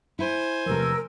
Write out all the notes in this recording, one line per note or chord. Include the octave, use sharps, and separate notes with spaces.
E4 C5 G#5
E2 C3 F3 A3 A#4 E6